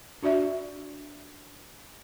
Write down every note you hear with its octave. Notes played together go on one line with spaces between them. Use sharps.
D4 F#4 D5 E5